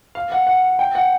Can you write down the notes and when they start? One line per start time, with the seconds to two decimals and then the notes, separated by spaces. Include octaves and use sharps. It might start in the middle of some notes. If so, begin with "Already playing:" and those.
0.15 F5
0.32 F#5
0.47 F#5
0.79 G5
0.95 F#5